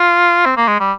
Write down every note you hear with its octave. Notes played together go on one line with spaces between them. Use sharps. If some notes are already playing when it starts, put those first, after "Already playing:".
Already playing: F4
C4
A#3
G#3
G3